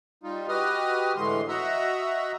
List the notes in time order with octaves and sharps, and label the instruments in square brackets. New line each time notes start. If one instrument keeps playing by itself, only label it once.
[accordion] G3 D#4 F4
F#4 G4 B4 D#5 D#6 F6
A2 D3 E3 G#3 C6
F#4 D#5 E5 F#5 A#5 E6